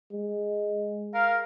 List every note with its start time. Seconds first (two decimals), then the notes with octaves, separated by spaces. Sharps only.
0.12 G#3
1.14 A#4 F5